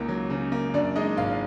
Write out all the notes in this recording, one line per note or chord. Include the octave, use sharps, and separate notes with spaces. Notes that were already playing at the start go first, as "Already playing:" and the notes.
Already playing: C#2 C#3 A#3 D#4
F#3
C#3
A#3
F#2 D4 D5
G#3 D#4 D#5
G#1 F4 F5